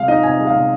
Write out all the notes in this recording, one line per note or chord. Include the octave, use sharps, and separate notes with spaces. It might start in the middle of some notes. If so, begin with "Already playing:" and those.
Already playing: C3 G#3 F5
D#4 D#5
C3 G#5
G#3
F5
C3